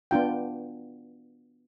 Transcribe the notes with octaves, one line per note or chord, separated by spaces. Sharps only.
B3 D4 F4 G5